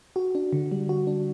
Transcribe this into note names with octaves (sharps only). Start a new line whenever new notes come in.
F#4
D4
D3
G3
F#4
D4